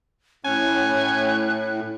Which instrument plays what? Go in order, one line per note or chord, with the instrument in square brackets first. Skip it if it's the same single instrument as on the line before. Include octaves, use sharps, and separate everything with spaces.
[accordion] A2 [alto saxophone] C#4 [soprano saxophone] G#5 [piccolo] F#6